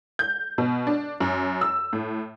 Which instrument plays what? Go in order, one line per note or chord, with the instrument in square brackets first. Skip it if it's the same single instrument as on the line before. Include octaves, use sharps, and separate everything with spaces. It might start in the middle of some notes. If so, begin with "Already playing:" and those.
[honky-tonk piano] G6
B2
D4
F#2
E6
A2